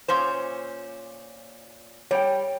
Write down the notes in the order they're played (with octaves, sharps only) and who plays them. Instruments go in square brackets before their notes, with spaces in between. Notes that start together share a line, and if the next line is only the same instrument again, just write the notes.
[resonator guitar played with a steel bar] A#2 C#4 C5
[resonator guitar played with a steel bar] G3 [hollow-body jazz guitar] C#5 G5